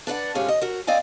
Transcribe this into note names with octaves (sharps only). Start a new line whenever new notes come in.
D4 B4 D5 F#5
D2 G#2 G#3 C#4 F4 G4
D#5
F#4 A#4
C4 D5 D#5 F5 G#5